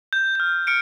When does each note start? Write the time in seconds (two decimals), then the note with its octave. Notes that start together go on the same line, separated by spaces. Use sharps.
0.13 G6
0.35 F6 G6
0.67 F6 C#7 D7